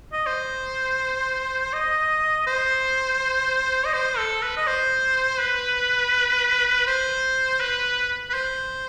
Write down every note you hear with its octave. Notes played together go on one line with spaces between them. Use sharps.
D#5
C5
D#5
C5
D#5
C5
A4
B4
D#5
C5
B4
C5
B4
B4
C5